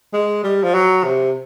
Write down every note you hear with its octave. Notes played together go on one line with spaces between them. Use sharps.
G#3
G3
F3
F#3
C3